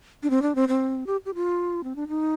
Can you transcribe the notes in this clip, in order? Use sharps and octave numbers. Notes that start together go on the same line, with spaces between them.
D4
C4
D4
C4
C4
G4
G4
F4
C4
D4
D#4